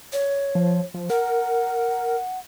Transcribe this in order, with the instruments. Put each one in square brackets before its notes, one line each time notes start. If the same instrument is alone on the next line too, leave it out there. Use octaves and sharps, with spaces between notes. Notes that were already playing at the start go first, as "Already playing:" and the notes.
[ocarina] C#5
[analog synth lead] F3
F3
[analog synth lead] A#4 [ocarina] F#5